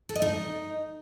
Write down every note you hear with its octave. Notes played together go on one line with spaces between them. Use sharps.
A4
D#5
D#4